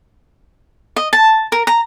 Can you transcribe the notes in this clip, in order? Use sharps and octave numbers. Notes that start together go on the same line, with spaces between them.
D#5
A5
A#4
A#5